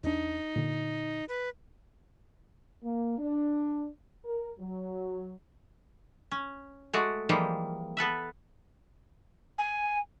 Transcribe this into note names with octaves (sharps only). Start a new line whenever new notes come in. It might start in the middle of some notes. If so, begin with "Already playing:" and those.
E2 D4 D#4
A#2 D3
B4
A#3
D4
A#4
F#3
C#4
G#3 A3 F#4 D5
E3 F3 G3 G#3 A#3
B3 A4 B4 E5
G#5